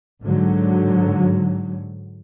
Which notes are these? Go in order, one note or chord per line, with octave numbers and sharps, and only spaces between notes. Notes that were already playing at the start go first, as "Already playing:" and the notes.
G#2 D3 F#3